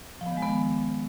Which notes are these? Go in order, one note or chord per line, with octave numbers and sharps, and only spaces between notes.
F3
B3
D#3
G#3
B3